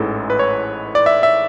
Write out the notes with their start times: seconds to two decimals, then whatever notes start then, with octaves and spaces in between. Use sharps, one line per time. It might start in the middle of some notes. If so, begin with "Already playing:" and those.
Already playing: A1 G#2 E3 G#3 A4
0.30 B4
0.39 C#5
0.95 D5
1.06 E5
1.23 E5